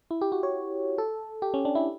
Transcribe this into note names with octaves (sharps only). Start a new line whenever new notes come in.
E4
G4
F#4
C#5
A4
G4
C#4
D4
E4